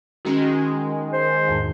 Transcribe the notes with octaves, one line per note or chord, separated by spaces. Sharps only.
D#3 G#3 C#4 F#4
C5
E2 G#2